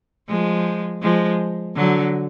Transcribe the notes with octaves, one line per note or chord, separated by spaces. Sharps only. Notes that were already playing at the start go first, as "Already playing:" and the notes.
F3 G#3
F3 G#3
D3 F#3